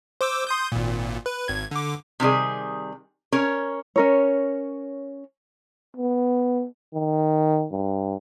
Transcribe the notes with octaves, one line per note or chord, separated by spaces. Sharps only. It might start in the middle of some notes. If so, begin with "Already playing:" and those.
C5 D6 E6
C6 D#6 G6
G#1 A#2
B4
G#1 G#6
D3 D6
C3 D#3 G3 G#4
C#4 A#4 C#5
C#4 A#4 C#5
B3
D#3
G2